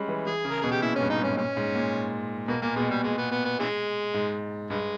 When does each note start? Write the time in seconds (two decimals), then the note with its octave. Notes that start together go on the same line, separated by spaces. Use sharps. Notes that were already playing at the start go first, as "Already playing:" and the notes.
Already playing: G3 G#3 C#4
0.08 E3
0.27 E3 G#4
0.45 C#3
0.50 A#4
0.61 B2 G#4
0.72 G4
0.82 A#2 E4
0.96 C#4
1.01 G2
1.10 D#4
1.20 G#2
1.24 C#4
1.37 A#2 C#4
1.57 G#2
1.75 A#2
2.48 B2 A#3
2.62 A#2 A#3
2.76 B2 G#3
2.90 A#2 G3
3.04 A#2 G#3
3.18 B3
3.32 B3
3.45 B3
3.60 C#3 E3 G#3
4.14 G#2
4.70 G2 G#3